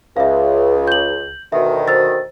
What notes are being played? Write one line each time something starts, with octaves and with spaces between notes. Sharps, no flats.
C#2 E5 F5
G6 F#7
D2 B2 D#3 E5
C5 E6 A6